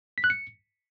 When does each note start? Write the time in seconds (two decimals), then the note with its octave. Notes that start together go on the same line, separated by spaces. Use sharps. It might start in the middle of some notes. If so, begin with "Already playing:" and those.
0.18 B6
0.24 F#6
0.30 C#7